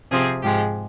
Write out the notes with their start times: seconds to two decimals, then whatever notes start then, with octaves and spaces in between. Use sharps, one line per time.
0.11 C3 F3 C4 G#4
0.42 G#2 F3 G#3 G4